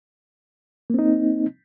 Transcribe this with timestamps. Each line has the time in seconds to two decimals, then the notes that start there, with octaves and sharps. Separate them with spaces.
0.90 A#3
0.94 C4
0.99 D#4